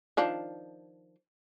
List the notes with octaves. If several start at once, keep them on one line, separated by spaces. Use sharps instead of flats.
D#3 F3 D4